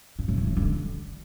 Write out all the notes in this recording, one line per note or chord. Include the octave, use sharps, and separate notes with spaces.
G2
A2
C#3
E3
D3